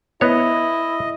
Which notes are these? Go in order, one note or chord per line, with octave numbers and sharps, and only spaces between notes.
B3 E4 C#5 D#5